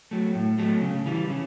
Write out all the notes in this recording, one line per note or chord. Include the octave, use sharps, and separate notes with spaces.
F#3 A3
A2
F#3 A3
C#3
E3 G3
C#3